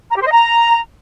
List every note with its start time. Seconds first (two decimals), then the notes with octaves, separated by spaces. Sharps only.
0.10 A#5
0.15 G4
0.21 C5
0.26 D#5
0.31 A#5